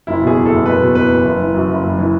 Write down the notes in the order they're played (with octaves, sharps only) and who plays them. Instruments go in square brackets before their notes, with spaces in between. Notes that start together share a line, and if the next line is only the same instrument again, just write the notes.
[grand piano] F#1 E4
B2
G#4
E2
A4
F#1
F#1 B4
B2
E2 B4
F#1
F#1
E3
F#2
F#1
F#1
E3